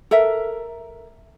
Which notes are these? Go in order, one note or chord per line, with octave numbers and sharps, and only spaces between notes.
A4 A#4 E5